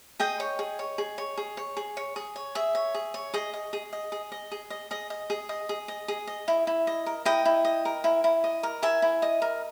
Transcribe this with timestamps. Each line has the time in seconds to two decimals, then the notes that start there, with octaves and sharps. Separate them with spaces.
0.20 G#4 D#5 G5
0.40 C#5
0.59 G#4
0.79 C#5
0.98 G#4
1.18 C#5
1.38 G#4
1.57 C#5
1.77 G#4
1.97 C#5
2.16 G#4
2.36 C#5
2.55 G#4 E5
2.75 C#5
2.94 G#4
3.14 C#5
3.34 G#4 D#5
3.53 D#5
3.73 G#4
3.93 D#5
4.12 G#4
4.32 D#5
4.52 G#4
4.70 D#5
4.91 G#4 D#5
5.10 D#5
5.30 G#4
5.49 D#5
5.69 G#4
5.88 D#5
6.08 G#4
6.27 D#5
6.48 E4
6.67 E4
6.87 D#5
7.06 A#4
7.25 E4 D#5 G5
7.45 E4
7.65 D#5
7.85 A#4
8.04 E4
8.24 E4
8.44 D#5
8.63 A#4
8.82 E4 E5 G#5
9.02 E4
9.22 D#5
9.42 A#4